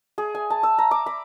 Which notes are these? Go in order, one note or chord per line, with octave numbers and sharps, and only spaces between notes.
G#4
G#5
A5
E6
A#5
D6
B5